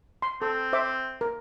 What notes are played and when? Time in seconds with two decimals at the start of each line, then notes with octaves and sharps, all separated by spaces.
0.22 C6
0.42 C4 A4
0.73 C5 E5 D6
1.21 A#4